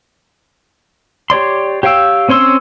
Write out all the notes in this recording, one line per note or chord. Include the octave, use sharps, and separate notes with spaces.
G4 C#5 D5 C6
G4 C#5 F5 G5 E6
C4 C#4 C#5 C6 E6